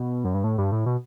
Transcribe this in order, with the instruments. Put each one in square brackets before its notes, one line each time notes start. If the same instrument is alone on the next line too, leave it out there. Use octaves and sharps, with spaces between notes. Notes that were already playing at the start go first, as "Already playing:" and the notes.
Already playing: [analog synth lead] B2
F#2
G2
A2
G2
A2
B2